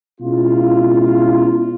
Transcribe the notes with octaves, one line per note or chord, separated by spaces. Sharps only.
B2 G#3 C#4 E4 F4